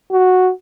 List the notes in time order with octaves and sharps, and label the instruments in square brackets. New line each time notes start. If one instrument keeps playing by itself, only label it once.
[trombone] F#4